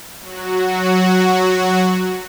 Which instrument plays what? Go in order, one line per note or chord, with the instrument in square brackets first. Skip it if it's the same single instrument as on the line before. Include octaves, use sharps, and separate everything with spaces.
[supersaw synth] F#3 F#4